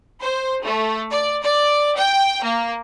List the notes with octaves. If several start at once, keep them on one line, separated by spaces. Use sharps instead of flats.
C5
A3
D5
D5
G5
A#3